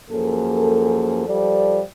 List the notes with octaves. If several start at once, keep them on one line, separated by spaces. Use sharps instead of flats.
F#2 F3 A#3 G#4 A4
F3 G3 A4 D5